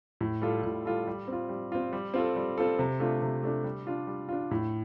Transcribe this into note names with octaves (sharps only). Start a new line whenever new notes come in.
A2
G3 F4 A4
A2
G3 F4 A4
G3
C4 F4
G3
C4 F4
G3
C4 F4 A4
G3
C4 F4 A4
C3
A3 D4 F4
C3
A3 D4 F4
G3
D4 F4
G3
D4 F4
A2